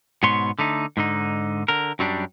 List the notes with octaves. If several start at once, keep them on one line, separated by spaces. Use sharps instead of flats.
G#2 B2 B3 C#5 C6
D3 A3 D#4
G#2 D3 D#4
D3 A#4
F#2 F#3 G3 D4